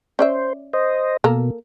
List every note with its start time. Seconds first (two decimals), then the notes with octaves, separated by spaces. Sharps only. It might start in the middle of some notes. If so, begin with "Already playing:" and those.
0.19 C#4 C5 D5 E5
0.73 C5 D#5
1.24 B2 A#3 A4 A#4